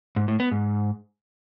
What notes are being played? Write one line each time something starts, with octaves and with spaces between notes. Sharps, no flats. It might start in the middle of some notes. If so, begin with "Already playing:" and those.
G#2
A2
B3
G#2